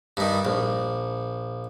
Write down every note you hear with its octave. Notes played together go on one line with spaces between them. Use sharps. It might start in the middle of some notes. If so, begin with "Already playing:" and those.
G2 D#3
A#1